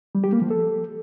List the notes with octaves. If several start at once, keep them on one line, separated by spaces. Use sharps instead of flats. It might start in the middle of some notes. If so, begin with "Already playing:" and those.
G3
G4
A#3
F3
A4